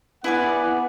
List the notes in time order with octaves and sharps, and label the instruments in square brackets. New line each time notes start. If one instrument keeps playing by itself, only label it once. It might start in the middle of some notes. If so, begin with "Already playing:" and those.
[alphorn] B3 [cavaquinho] E4 G#4 D5 [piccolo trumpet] F#5